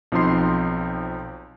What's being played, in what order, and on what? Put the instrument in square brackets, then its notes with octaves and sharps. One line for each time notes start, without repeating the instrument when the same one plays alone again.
[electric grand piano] B1 F3 C4 D#4 C6 C7